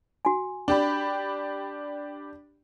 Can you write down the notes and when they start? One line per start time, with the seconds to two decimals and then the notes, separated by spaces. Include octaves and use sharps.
0.25 F#4 G#5
0.68 D4 G4 B5